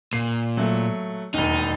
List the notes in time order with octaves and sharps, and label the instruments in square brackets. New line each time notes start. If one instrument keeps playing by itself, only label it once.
[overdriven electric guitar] A#2 [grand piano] C7
[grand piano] F#3 A3
[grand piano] E1 D#2 [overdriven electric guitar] D#4